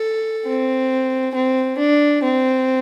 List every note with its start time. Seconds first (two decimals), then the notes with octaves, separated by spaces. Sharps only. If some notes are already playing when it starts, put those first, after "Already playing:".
Already playing: A4
0.46 C4
1.35 C4
1.78 D4
2.23 C4